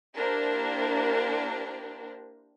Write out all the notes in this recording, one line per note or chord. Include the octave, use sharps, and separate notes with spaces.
A#3 D4 E4 G4 A#4 C5